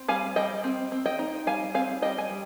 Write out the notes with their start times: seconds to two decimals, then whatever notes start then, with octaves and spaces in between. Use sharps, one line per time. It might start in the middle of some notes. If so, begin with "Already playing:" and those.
Already playing: C4
0.08 G3 F5 G#5
0.36 G3 D#5 G5
0.64 C4
0.92 C4
1.06 D#5 G5
1.19 D#4
1.47 G3 F5 G#5
1.74 C4 F5 G#5
2.02 G3 D#5 G5
2.18 G#5
2.30 G3